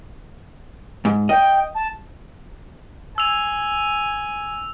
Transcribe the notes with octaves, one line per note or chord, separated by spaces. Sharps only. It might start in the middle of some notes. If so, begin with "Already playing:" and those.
G#2
D#5 G5
A5
G#5 E6 F7